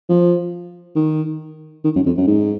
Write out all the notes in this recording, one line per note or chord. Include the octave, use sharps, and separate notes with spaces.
F3
D#3
D#3
F#2
F2
F#2
G#2